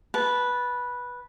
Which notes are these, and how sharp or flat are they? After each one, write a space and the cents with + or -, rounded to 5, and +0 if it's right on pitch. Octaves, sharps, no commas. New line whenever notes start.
B4 -10 A5 -15